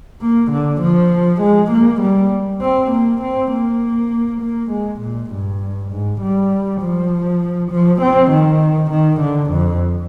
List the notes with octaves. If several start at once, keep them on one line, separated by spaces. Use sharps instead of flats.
A#3
D3
F3
G#3
A#3
G3
C4
A#3
C4
A#3
A#3
G#3
A#2
G2
G#2
G3
F3
F3
C4
D#3
D#3
D3
F2